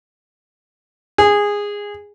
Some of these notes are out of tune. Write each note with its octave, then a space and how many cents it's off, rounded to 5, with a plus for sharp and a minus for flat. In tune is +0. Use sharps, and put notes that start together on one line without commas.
G#4 -15